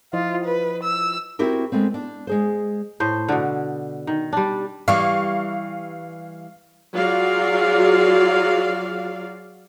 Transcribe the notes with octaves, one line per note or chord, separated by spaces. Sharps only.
F3 E4 F4 D#5
B4
E6
C4 E4 F#4 G4 A#4
G#3 A3 B3 C4
D4
G#3 G#4 C5
A2 C5
B2 D3
D#3
G3 D4
E3 G3 F5 C#6
F#3 F4 F#4 G#4 D5 F5